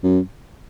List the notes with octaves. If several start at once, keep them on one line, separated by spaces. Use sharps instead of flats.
F#2